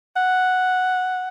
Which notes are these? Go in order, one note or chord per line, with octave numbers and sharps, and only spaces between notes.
F#5